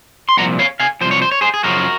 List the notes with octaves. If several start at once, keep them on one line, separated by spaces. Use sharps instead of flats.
C6
C2 A#2 F3 F#5 A#5
C#5 F5
F5 G#5
C2 A#2 F3 C5
C#5
C5
C#5
G#4 C5
G#4
F#2 C#3 F3 F#4 A#4